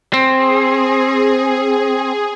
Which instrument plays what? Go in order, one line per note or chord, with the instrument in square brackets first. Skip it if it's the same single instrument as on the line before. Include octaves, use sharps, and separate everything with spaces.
[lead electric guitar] C4 [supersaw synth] G#4